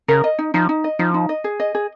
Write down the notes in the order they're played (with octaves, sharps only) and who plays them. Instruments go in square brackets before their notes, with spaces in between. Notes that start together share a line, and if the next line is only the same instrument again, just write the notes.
[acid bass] C#3 [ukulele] A#4
[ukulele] D#5
D#4
[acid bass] F3 [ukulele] D#4
[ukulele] D#4
D#5
[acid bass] F3 [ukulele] D#4
[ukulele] D#4
D#5
G#4
D#5
G#4